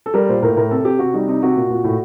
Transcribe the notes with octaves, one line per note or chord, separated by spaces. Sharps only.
A4
G3 A#4
A#2 C5
A2 A#4
A2 A#4
C3 A4
C3 G4
C3 F#4
G3 D#4
C3 D#4
C3 F#4
A#2
A#2
A2